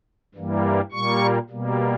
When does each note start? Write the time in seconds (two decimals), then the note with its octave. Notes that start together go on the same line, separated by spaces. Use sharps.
0.35 G2 E3 G3 A#3
0.92 A#2 G3 A#3 C#6
1.50 B2 G3 A#3